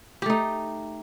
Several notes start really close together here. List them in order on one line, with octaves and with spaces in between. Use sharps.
G4 A3 D#4